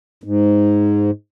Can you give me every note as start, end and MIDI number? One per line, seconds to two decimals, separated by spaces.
0.24 1.11 44